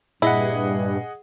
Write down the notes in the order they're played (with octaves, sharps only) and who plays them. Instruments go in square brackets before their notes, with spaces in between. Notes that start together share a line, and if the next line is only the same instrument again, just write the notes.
[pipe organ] G2 [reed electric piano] A#2 [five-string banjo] E4 [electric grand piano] G#4 D#5 F#5